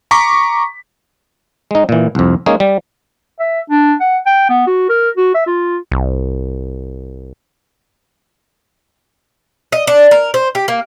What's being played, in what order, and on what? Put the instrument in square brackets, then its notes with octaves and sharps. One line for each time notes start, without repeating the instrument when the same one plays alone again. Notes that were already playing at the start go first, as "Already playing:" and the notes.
[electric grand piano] A#5 C#6 D6 B6
[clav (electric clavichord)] G#3 D#4
A#2 E3
C2 F2
G#3 A#3 C#4 D#4 G#4
G3
[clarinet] E5
D4
F#5
G5
B3
F#4
A#4
F#4
E5
F4
[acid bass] C2
[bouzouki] D#5
D4
A#4
C5
G4
A#3